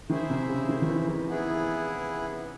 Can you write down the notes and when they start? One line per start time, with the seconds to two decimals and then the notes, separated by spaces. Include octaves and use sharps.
0.09 D#3 E4 G#4 C5 E5
0.30 C3
0.49 C#3
0.69 D#3
0.82 D#3
0.89 E3
1.09 E3
1.29 B3 E4 G#4